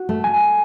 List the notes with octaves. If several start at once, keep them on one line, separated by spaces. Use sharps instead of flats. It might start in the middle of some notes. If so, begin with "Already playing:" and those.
Already playing: F#4
A3
G#5